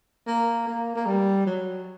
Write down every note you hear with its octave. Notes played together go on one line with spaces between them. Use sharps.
A#3
A#3
A#3
G3
F#3